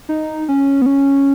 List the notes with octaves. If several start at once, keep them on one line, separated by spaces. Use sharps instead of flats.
D#4
C#4
B3
C#4